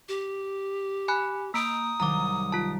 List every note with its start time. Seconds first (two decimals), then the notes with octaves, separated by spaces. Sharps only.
0.09 G4
1.08 G#5 B5 F#6
1.54 A#3 A#5 D#6 G6 D7
2.00 C2 D#3 F#3 A#5 D6
2.52 F4 A5